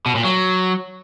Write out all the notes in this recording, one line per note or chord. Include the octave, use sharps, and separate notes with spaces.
B2
A#2
F#3